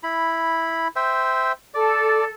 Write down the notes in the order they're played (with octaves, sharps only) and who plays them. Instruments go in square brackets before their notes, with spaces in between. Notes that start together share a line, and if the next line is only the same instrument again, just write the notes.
[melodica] E4 B5
C5 E5 G5
[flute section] A4 [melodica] D5